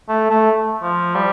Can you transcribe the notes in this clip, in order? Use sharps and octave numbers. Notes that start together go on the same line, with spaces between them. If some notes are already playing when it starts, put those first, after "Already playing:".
A3
A3
F3
G3